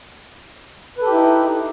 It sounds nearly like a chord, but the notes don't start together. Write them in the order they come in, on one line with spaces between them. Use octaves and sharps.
B4 A4 G4 E4 D#4